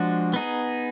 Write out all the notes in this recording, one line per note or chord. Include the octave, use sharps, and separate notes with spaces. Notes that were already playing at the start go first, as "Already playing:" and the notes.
Already playing: F3 G#3 D4 F#4
B3 D#4 G#4